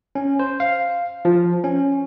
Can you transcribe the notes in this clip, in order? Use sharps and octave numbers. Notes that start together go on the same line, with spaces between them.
C#4
C5
F5
F3
C#4